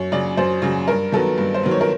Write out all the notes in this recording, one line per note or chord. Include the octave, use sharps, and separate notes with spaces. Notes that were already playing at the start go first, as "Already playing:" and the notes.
Already playing: F#2 C#5
C#3 F#3 D5
F#2 C5
C#3 F#3
G2 A#4
D#3 F#3 B3 A4
G2
C5
D#3 F#3 B3
C#5
A#4